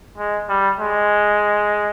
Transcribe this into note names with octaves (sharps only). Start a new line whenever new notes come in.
G#3
G3
G#3